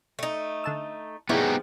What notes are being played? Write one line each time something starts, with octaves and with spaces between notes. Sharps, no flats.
A3 D#4
D3 A5 E6
F3 B3 D#4 E4 G4 G#4 C#5 D5